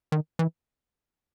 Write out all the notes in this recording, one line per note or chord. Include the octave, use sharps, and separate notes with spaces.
D#3
E3